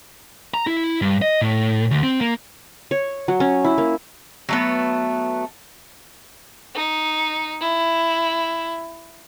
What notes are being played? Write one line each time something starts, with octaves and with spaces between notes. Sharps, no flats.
A#5
E4
G2
D#5
A2
D2
C4
A#3
C#5
F#3
C#4
E4
A#3
F#3 A3 B3
D#4
E4